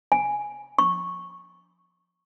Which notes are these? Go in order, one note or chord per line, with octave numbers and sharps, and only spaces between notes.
G#5
C#6